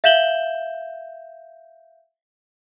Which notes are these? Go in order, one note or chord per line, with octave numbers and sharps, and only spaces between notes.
E5 F5 G6 E7 F#7 G7